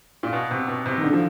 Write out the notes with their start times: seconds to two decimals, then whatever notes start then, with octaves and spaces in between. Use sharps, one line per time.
0.23 A#2
0.33 B2
0.51 C3
0.68 B2
0.86 C3
0.98 D#3
1.03 D3
1.13 F3